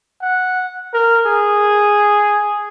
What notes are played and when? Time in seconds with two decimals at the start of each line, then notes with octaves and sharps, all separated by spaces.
0.22 F#5
0.93 A#4
1.26 G#4